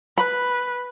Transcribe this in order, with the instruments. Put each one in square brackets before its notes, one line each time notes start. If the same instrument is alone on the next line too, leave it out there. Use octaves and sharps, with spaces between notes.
[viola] B4 [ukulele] B5